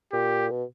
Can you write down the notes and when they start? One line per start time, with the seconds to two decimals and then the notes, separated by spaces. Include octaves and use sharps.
0.12 A#2 G4
0.51 B2